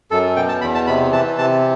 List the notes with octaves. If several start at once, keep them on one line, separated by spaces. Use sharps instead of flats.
F#2 A4
B2 G5
A5
E2 B5
A5
C3 B5
E3 A5
C3 A5